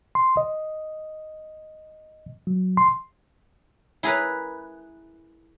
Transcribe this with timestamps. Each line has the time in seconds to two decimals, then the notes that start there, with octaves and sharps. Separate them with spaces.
0.15 C6
0.37 D#5
2.47 F#3
2.77 C6
4.03 E4 G#4 A#4 B4